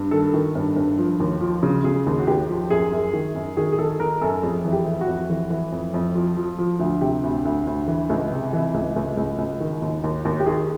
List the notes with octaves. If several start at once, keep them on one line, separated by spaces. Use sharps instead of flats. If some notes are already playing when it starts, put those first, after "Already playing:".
Already playing: G2
D#3 A4
D#3
G2
G2
F3
D#2
F3
C#3
C#3 G#4
D#2
F#4
D#2 G4
F3
F#2 G#4
F#2
D#3
F#2
D#3 G#4
G#4
D#3 A4
D#3 A#4
F#2 A4
F2 G#4
E3
G4
E3
F#4
F2
E3
E3
F2
F2
F3
F3
F3
D2
C3 G4
D2
D2
D2
E3
C#2
C3
E3
C#2
C#2
C#2
C#2
D#3
D#2
D#2
D#2
G4
D#3 G#4